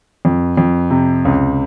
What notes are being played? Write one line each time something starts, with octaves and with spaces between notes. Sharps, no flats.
F2
F2
C3
C#2